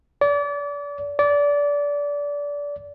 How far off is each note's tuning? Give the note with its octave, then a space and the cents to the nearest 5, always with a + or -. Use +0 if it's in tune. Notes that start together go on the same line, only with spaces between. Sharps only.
D5 -35
D5 -25